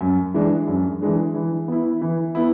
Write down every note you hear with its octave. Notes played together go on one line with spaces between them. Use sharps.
F#2
E3 G#3 D4
F#2
E3 G#3 D4
E3
B3 E4
E3
B3 E4